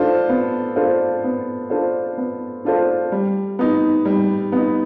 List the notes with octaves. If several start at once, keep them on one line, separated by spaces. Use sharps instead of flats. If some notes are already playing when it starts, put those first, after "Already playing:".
Already playing: D4 F4 A4 C5
B3
D4 F4 A4 C5
B3
D4 F4 A4 C5
B3
D4 F4 A4 C5
G3
B3 D#4
G3
B3 D#4